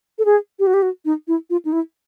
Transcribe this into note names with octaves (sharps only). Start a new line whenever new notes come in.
A4
G#4
G4
F#4
G4
F#4
D#4
E4
F4
D#4
E4